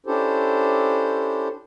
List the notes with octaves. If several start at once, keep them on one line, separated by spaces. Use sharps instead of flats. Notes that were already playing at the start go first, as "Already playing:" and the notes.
C#4 D4 E4 G4 A4 C5